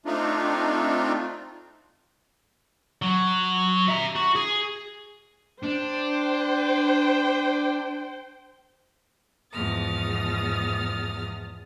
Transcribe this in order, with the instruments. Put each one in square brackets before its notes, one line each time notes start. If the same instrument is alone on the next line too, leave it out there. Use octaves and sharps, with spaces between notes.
[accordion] A3 C4 D4 D#4 F4
[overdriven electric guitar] F#3
E5 A#5
F#4
G#4
[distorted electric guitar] D4 [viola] C5 G5
[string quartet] E2 G#2 F3 D#6 F6 A6